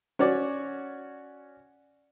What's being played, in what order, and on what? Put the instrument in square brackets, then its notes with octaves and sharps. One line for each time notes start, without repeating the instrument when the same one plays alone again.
[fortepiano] C#4 F#4 C#5 D5